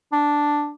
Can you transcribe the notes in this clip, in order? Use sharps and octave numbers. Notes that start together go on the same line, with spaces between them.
D4